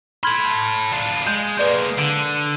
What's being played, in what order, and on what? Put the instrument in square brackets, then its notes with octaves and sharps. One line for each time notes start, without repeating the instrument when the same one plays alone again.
[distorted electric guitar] A4 B5 [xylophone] C6 F6 G#6
[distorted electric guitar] D4 F4
[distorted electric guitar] G#3 [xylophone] G6
[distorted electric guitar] G#3 A#3 [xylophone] B4 D5 G6
[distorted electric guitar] D3 [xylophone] D7